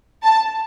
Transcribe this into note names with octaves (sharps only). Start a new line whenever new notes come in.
A5